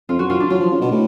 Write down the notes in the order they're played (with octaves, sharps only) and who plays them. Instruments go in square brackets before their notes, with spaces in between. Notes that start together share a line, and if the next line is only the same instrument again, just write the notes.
[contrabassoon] F2 [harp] F4
[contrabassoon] F#2 [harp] F#4
[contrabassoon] F#2 [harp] F4
[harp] D4
[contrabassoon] F#3 [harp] F4
[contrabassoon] F3
C#3
B2
A2